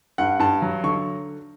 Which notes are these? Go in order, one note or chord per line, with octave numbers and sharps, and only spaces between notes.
G2 F#5
G2 A5
F#3
D3 C#6